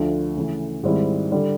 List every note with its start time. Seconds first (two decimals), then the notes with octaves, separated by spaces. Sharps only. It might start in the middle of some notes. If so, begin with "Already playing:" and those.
Already playing: D2 D3 F3 A3
0.36 C#3 E3 A3
0.83 G#2 D#3 G3 C4 E4
1.32 D3 G3